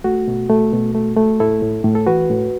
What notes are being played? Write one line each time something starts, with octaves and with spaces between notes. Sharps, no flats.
A3 F#4
B2
A3
B2
A3
A3
A2 E4 A4
A2
A2
A4
E3 F#4 B4
A2